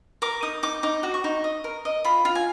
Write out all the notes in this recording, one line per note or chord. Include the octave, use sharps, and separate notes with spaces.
A#4 D6
D#4 D#6
D#4 D6
D#4 D6
F#4
C#6
D#4
D#5
A#4
D#5
F4 B5
F4
G#5